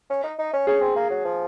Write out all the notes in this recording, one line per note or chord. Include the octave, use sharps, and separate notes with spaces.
C#4
D#4
D#4
C#4
C#4 G#4
C4
A#3
F#3
F3